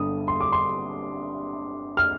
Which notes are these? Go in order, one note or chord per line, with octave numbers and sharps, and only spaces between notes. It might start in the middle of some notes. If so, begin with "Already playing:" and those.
Already playing: G1 G2 D3 G3 D#6
C6
D6
C6
F6